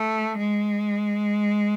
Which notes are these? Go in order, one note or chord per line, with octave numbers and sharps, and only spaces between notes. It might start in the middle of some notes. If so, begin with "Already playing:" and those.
Already playing: A3
G#3